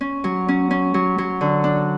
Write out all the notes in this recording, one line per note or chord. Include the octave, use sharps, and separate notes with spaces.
C#4
F#3
C#4
C#4
F#3
F#3
D3
D4